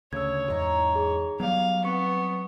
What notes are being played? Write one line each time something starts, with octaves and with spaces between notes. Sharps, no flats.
D2 C#3 C#5 E6 G#6
E2 G#2 D#4 A#5 C#6
G#4
F#3 G3 B3 F5
B3 C4 C#6 C#7